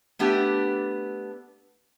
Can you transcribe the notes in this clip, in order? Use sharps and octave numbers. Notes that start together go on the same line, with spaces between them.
A3 B3 D4 G4